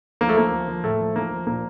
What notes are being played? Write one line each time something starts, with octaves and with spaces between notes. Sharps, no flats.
F3 A#3
A3
F3 A#3
F3
F3
A2 A3
F3
F3 A#3
F3
A#2 A#3